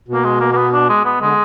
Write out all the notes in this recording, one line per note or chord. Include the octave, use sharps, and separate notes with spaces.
B2 A#3
G#3
A#3
A#3
B3
D4
G#3
B3
D3 G#3